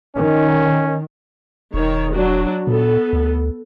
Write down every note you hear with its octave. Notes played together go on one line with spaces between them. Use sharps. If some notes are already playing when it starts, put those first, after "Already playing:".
D#3 C#4
E1 D#3 C#5
F#3 D4 F#4
A#2 B3 A4
D2